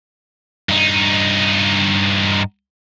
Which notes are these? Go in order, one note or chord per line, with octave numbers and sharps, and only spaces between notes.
G2 D#4